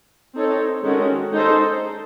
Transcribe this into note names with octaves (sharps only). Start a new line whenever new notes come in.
C4 D#4 A4 C#5
D#3 G#3 C#4 F#4 A4
G#3 D#4 A4 C5